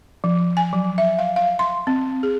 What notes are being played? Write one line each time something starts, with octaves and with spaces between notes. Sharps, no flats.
F3
G#5
F#3
E5
F5
F5
C6
C4
G#4